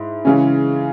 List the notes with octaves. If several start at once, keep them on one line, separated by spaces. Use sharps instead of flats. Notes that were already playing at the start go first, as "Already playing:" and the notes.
Already playing: G#2 E4
C#3 E3 G#3 C#4